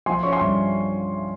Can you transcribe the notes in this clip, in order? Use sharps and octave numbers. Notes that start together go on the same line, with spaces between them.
F3 G#5 C6
C#4 C#6
G#5 C6
G2